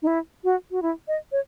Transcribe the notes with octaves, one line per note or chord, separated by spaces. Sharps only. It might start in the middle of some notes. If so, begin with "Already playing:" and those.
D#4
E4
F#4
F#4
E4
D#5
C#5